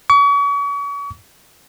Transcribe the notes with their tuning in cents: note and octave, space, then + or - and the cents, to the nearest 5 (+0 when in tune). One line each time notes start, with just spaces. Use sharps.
C#6 +40